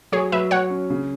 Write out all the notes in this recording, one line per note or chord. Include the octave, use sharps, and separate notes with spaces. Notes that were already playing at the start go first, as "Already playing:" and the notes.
F#3 G#4 C#5
F#3 B4 E5
F#3 C#5 F#5
C#4
C#3